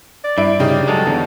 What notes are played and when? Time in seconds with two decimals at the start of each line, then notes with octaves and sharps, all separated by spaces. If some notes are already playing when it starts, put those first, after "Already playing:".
0.24 D5
0.38 G2 E4 D7
0.59 C#3 D#4 G4
0.88 F#3 G#3 A4
1.05 E2 D3